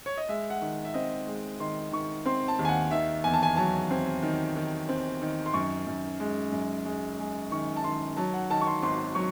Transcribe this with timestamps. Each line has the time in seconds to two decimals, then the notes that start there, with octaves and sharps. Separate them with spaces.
0.06 C#5
0.17 D#5
0.29 G#3 E5
0.50 F#5
0.62 D#3
0.85 E5
0.94 C4 D#5
1.27 G#3
1.60 D#3 C6
1.92 D#3 C#6
2.26 C4 C6
2.48 A5
2.59 D#2
2.65 G#5
2.69 F#5
2.91 D#3 E5
3.24 E2 G#5
3.33 A5
3.43 G#5
3.56 F#3 A5
3.91 C4
4.23 D#3
4.56 D#3
4.89 C4
5.22 D#3
5.46 C6
5.54 F#2 C#6
5.87 F#2
6.20 G#3
6.52 F#2
6.86 G#3
7.19 G#3
7.52 D#3 C#6
7.76 A5
7.84 D#3 C6
8.17 F#3 A5
8.34 F#5
8.50 D#3 A5
8.61 C#6
8.67 C6
8.82 G#1 C6
9.15 F#3 C#6